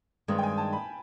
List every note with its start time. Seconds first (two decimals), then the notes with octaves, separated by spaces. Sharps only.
0.28 G2 D#3 G#3 C4
0.38 G5
0.43 G#5
0.58 A5
0.73 B5